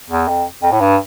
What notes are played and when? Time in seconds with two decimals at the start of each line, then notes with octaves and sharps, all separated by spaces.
0.10 E2
0.28 F2
0.63 F2
0.72 A2
0.81 G2